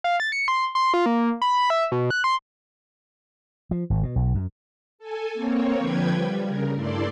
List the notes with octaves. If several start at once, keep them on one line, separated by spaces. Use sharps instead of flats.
F5
A6
C#7
C6
C6
F4
A#3
B5
E5
B2
F#6
C6
F3
G#1
B2
B1
F#2
A4 G#5
A#3 C4 C#5
D3 F3 B4 G5 G#6
G3
C#3 A#4
G2 A3 E4 D5 C6